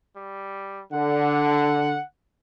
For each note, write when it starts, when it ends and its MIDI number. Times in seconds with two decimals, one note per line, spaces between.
0.16 0.83 55
0.93 1.97 50
0.93 2.03 78